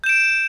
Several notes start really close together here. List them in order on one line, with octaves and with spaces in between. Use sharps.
G6 E7 D7